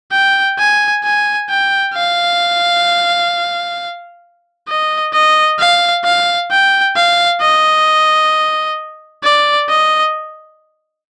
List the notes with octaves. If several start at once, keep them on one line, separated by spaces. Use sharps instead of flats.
G5
G#5
G#5
G5
F5
D#5
D#5
F5
F5
G5
F5
D#5
D5
D#5